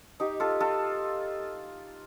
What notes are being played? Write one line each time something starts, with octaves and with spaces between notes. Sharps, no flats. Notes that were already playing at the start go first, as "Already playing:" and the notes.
D#4 G4
F4 A4
F4 A4